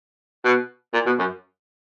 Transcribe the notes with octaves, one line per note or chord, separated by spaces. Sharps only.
B2
A#2
B2
F#2